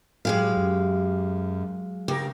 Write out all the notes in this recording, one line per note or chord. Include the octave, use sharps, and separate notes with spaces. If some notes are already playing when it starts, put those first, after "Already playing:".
A2 F#3 G#3 A3 G4 G#4 F5
F#2
D2 C#3 G4 A#4